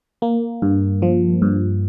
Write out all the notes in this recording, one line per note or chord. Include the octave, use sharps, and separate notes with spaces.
A#3
G2
F3
G2